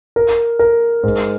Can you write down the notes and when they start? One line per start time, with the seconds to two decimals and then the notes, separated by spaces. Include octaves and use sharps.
0.16 A#4
0.59 A#4
1.03 G#2